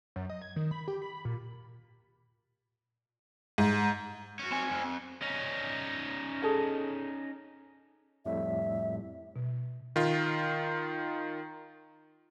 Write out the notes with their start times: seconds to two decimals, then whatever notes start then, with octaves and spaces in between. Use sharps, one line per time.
0.16 F#2
0.30 D#5
0.42 G#6
0.56 D#3
0.71 B5
0.88 G4
1.02 B5
1.25 A#2
3.58 G#2
4.39 C#4 F#4
4.51 C4 G#5
4.71 F2
5.22 C#4 D#4
6.42 G#4 A4 D#5
8.26 F2 A2 G3 E5
9.36 B2
9.96 D#3 F4